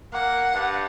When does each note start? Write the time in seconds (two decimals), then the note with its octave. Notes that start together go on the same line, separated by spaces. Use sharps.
0.13 A#3 F#5
0.53 G2